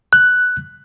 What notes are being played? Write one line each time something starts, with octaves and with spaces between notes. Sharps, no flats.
F#6